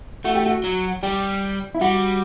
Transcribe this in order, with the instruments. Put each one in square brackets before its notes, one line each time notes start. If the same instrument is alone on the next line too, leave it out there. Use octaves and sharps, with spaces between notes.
[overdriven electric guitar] A3 [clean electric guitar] F#4
[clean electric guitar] G4
F#4
[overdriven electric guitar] F#3
[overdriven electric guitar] G3 [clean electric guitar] G4
[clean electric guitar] E4
[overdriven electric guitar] G3 [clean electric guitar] F#4